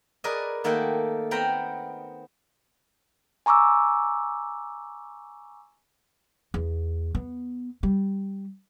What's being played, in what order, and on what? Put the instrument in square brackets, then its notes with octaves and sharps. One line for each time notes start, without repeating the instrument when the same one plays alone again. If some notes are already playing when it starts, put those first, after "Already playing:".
[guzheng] G#4 A#4 B4 D5 D#5
D#3 A3 A#3 A4 F#5 G5
B3 C4 A#4 G5 A#5 B5
[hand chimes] G#5 A#5 C#6 D6 E6
[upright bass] E2
B3
G3